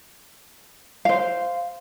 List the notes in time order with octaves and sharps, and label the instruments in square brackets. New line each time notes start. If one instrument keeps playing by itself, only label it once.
[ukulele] C5 F5